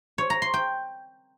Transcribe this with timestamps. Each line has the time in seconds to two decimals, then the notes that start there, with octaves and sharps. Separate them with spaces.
0.18 C#5
0.30 A#5
0.42 C6
0.54 G5